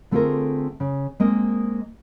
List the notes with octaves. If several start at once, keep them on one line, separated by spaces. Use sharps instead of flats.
D3 A3 C4 F4 G#4 A#4
C#3
G#3 A#3 C4 A#4 D#5